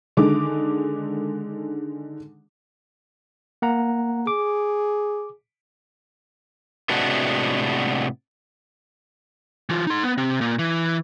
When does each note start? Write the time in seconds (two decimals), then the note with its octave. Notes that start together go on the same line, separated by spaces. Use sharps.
0.17 D3 D#3 G#3 D6
3.62 A#3 F#5 A#5
4.27 G#4 D6
6.89 A2 C3 G#3 B3 D4 F#4
9.69 E3 F4
9.87 D#4 C6
10.03 B3
10.18 C3
10.41 A#2
10.59 E3